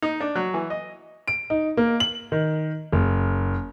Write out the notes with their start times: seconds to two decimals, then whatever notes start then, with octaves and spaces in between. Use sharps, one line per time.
0.02 D#4
0.21 D4
0.35 F#3
0.54 E3
0.70 D#5
1.28 D7
1.50 D#4
1.77 A#3
2.00 F#7
2.32 D#3
2.92 F#1